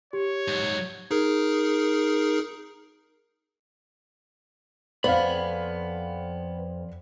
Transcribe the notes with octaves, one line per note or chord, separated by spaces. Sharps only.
G4 C#5
G#2 F#3
D#4 G#4 A#4
F2 B3 C5 D5 F5 B5